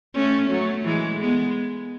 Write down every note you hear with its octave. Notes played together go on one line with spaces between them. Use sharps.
A3 C#4
F#3 A3
E3 G#3
G#3 B3